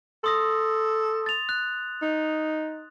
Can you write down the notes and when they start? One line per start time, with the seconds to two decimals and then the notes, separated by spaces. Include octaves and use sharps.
0.24 A4 C6 D#6 A#6
1.26 A6 F7
1.49 F#6
2.02 D#4